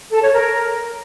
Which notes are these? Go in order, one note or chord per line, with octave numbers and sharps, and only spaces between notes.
A4
C#5
A#4